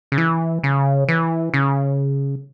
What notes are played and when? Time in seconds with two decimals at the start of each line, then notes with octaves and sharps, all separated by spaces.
0.12 C#3
0.18 E3
0.63 C#3
1.08 E3
1.54 C#3